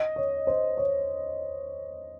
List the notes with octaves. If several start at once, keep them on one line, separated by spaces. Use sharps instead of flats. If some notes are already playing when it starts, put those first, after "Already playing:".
Already playing: D#5
C#5
C5
C#5